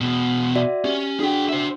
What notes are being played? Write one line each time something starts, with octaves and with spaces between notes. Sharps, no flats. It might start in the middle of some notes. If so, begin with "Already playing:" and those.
E2 B2
F#4 D5 E5
C#4 G4
D4 F#4 G#4 G5
C5 E5